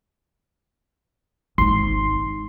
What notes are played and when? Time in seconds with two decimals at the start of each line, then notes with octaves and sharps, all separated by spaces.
1.58 G#1 G#2 C6